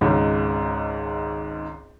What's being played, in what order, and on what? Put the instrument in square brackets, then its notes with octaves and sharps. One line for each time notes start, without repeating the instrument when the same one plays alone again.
[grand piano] G#1 C#2 G#2